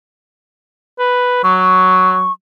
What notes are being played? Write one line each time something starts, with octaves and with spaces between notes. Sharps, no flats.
B4
F#3 C#6